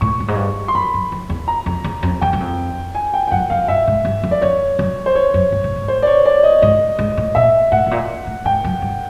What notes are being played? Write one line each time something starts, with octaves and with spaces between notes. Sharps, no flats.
A2 C#6
G2
G#2
G2
C6
F#2 B5
F#2
F2
E2
A#5
F2
E2
F2
E2 G5
F#2
F2
G#5
G5
G5
F#2 F#5
F#2 F5
G2 E5
G#2
G2
F2
D5
F2 C#5
F#2
C5
C#5
F#2
G2
G#2
G#2
C5
D5
C#5
D5
D#5
G#2 D#5
G#2
A2
A#2 E5
A2 F#5
A2
A#2
A2
G#2 G5
F#2
G2